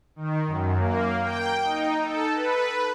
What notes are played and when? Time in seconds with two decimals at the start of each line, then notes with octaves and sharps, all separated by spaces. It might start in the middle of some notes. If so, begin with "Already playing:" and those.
0.16 D#3
0.47 F#2
0.78 A#3
1.22 G5
1.63 D#4
2.04 A4
2.34 B4